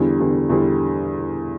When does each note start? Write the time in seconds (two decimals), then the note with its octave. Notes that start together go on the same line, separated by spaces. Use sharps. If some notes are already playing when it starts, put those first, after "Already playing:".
Already playing: E2 D3 G3
0.19 E2 D3 G3
0.49 E2 D3 G3